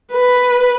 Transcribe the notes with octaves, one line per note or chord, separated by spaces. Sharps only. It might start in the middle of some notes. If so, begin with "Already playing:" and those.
B4